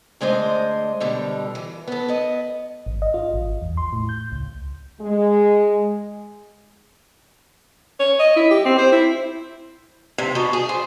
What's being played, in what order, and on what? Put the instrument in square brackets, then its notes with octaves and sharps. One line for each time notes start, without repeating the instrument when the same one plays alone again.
[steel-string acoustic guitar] D2 G#3 D4 C5 D#5
B2 D3 G3
E3
B3 A4
B3 D#5
[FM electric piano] G#1
D#5
F4
G#1
E2
C6
A2
G6
C#2
[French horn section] G#3
[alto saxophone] C#5
D#5
E4
G4
C4
C5
E4
[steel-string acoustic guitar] C3
B2
G#4
C5